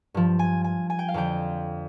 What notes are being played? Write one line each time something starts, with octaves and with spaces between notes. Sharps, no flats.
G2 F3
G#5
G#5
G#5
G5
F5
F2 D3 F3 G5